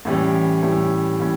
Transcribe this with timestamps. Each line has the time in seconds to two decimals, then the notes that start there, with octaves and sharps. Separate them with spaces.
0.05 A2 E3 G3 C#4
0.63 A2 E3 G3 C#4
1.20 A2 E3 G3 C#4